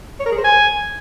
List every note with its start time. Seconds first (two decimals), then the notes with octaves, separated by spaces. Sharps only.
0.20 C#5
0.26 A#4
0.32 G#4
0.38 C5
0.44 G#5